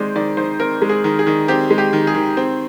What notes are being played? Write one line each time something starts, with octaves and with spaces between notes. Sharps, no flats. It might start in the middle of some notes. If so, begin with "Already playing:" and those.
Already playing: D#3 G#3 C4 C5 D5
D#3 D5
D#3 C5
C4 A#4
G#3
G#4
D#3
G#4
D#3
C4 G4
G#3
G4
D#3
G#4
D#3
C4